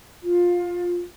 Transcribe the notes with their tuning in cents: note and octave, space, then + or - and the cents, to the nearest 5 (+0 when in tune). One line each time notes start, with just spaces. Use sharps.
F4 +15